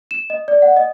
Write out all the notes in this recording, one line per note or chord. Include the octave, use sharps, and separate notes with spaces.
E7
D#5
D5
F#5
D#5